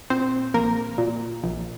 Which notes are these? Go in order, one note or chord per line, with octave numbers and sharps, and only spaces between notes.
A#2 C4 C5
A#1 A#3 A#4
A#2
A#1